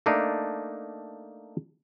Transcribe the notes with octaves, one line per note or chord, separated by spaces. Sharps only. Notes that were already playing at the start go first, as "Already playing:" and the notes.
A3 A#3 D4 D#4